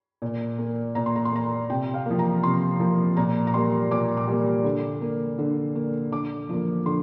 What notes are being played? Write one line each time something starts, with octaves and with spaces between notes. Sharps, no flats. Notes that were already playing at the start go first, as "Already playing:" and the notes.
A#2
A#3
A#2 A#5
C6
A#5
C6
A#3 A#5
C3 G5
F5
F3 A#3
A#5
C3 C6
F3 A#3
A#2 A#5
A#5
G3 A#3 C6
A#2 D6
D6
G3 A#3
D3
A#3
D3
A#3
D3 D6
F3 A#3
D3 C6